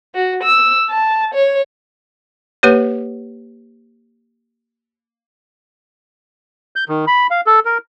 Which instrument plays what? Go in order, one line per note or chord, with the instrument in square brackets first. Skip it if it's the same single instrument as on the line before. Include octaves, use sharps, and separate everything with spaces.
[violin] F#4
E6
A5
C#5
[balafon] A#3 G4 B4 C#5
[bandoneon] G6
D#3
B5
F5
A4
A#4